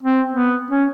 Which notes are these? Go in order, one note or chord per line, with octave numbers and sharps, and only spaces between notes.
C4
B3
C#4